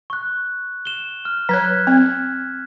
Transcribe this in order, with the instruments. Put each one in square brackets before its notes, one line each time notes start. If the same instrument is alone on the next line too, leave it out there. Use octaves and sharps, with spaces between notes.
[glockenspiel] C#6 F#6
E7 G7
F6
[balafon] F#3 C#5 [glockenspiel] F#6 G#6 B6
[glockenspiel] F#6
[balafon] C4